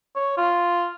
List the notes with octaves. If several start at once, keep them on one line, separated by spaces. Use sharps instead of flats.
C#5
F4